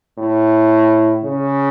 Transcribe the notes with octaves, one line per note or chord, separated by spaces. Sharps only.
A2
C#3